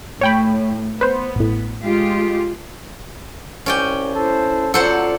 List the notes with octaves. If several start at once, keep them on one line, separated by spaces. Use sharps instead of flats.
A2 C#5 G5 B5
B3 B4 C5
A1 A2
G#3 F4 G4
C2 C#4 D5 G5
E4 A4 C5
F#3 F4 A4 C5 D5 F#5